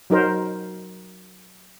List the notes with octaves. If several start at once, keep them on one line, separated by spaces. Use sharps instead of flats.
F#3 D#4 A#4 C5